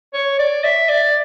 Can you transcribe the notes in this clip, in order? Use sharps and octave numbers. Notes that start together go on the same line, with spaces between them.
C#5
D5
E5
D5